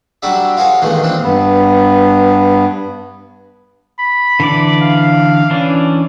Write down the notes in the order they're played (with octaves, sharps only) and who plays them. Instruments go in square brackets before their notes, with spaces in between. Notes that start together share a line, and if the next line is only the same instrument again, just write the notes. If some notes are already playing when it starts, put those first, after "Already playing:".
[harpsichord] F#3 G3 D4 F#4 D5 E5
F4 F#4 G#4 A#4 C#5
E2 G2 A#2 D#3 G#3 A3
E2 A#2 C4 D4
[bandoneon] G2 B3
[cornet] B5
[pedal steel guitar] D3 E3 D5
[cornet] F5
[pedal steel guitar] E3 C#4 D4 [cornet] D5